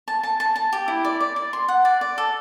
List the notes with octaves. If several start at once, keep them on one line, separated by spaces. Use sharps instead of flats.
A5
A5
A5
A5
G4
E4
D5
D5
D5
C6
F#5
D5
D5
A4